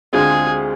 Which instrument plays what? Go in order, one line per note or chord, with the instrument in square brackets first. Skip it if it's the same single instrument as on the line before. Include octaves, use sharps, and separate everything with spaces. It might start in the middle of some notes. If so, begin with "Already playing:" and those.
[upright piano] D2 D3 G#3 C4 F4 [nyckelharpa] G#4